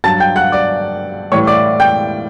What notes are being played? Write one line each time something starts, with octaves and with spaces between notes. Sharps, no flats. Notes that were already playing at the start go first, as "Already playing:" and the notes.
G2 F#3 A5 A6
G5 G6
F#5 F#6
D5 D6
A2 E3 G3 C#5 C#6
D5 D6
G5 G6